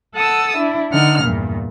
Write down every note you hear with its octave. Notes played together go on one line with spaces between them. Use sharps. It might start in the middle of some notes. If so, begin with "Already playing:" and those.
A4 F#5 A5 D#6 E6
D4 E4
D3 D#4 F#5 F6
E2 G2 A#2